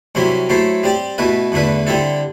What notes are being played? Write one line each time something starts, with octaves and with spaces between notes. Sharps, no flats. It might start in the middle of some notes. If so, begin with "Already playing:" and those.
C2 C3 F#3 C4 E4
F#3 A3 E4 A4 C5
G3 C4 G4 D5
B2 A3 E4 B4
E2 D3 A3 E4 B4
D3 G3 C4 E4 A4